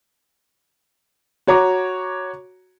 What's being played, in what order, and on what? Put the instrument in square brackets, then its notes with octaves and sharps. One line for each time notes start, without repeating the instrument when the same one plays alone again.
[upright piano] F#4 C#5 A#5 D6